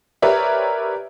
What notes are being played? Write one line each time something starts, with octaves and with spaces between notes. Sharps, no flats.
G4 A#4 B4 C#5 D5 E5